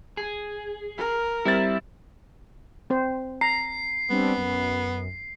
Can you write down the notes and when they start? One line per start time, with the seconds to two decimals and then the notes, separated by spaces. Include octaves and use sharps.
0.17 G#4
0.97 A#4
1.45 G3 C4 E4 A6
2.90 C4 C5
3.41 A#5 C7
4.10 G3 B3 C4 D4
4.36 F#2